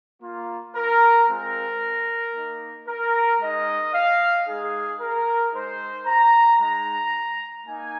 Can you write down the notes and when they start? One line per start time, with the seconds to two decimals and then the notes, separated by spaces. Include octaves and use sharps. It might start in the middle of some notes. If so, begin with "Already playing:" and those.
0.23 A#3 F4
0.76 A#4
1.29 G#3 C4 F4 A#4
2.35 A#3 D#4
2.87 A#4
3.40 G#3 D#4 D#5
3.94 F5
4.47 G#3 D#4 G#4
5.01 A#4
5.54 G#3 D#4 C5
6.07 A#5
6.60 G#3 D#4 A#5
7.66 A#3 D#4 G#5